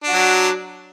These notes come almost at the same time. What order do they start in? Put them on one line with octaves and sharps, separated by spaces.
D4 F#4 F#3